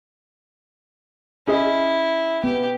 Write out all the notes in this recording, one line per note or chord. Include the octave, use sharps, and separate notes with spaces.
C#4 E4 G#4 D#5
B3 G4